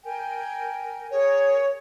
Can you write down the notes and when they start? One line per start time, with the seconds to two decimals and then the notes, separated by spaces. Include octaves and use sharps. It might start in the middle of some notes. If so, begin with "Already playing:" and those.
0.04 A#4 G5 G#5
1.11 G#4 A#4 C#5